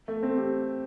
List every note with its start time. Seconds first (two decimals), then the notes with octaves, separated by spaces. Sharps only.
0.08 A3
0.23 C4
0.37 G4